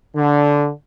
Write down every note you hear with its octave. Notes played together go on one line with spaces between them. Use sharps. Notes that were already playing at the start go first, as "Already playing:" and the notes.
D3